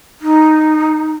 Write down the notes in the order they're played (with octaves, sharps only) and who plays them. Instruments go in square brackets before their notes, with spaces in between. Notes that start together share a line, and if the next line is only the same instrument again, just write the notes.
[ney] D#4